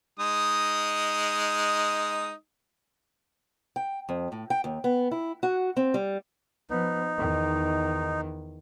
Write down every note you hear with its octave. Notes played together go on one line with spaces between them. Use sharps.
G#3 D#4 D#6
G5
F2
A2
G5
D#2
B3
E4
F#4
C4
G3
F3 B3 D#4
E2 D#3